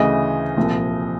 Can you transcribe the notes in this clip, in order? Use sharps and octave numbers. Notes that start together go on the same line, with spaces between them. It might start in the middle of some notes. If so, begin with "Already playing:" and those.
Already playing: D2 C#3 E3 D#5
C2 A#2 F3